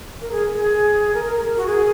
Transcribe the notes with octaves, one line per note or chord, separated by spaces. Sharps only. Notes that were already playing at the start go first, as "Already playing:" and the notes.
A#4
G#4
G#4
A#4
A#4
A#4
F#4
G#4